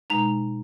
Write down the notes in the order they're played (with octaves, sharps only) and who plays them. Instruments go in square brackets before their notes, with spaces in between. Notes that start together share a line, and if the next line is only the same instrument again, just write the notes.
[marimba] B2 G#3 D#4 [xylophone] A#5